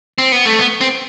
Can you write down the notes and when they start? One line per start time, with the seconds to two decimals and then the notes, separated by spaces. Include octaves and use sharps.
0.18 C4
0.32 B3
0.46 A3
0.59 B3
0.81 C4